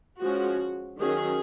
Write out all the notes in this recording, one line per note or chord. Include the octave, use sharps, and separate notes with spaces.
F3 G#3 C#4 F#4
D#3 F#3 C#4 G#4